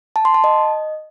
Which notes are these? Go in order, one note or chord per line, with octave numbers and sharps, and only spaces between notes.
A5
C6
A5
D#5